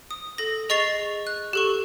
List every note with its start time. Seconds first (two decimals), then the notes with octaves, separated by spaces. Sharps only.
0.11 D#6
0.38 A4 A#6
0.69 G#4 D#5 C#6 A6 C7 F7
1.27 F#6
1.53 G4 A4 C#6